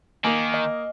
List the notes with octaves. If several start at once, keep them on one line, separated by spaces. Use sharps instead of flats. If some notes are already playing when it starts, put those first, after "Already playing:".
D#3 A#3 G#5
D#5